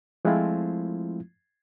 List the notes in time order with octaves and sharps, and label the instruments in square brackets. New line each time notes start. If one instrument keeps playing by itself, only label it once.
[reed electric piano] F3 G#3 A3 C4 E4 F4